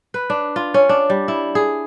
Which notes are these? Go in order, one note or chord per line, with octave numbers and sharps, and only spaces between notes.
B4
D4
F4
C#4
D4
G3
E4
G#4